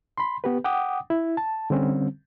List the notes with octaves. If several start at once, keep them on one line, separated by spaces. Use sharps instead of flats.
B5 C6
B3 G4 B4
F#5 G5 D6 D#6
E4
A5
D3 G3 C4 C#4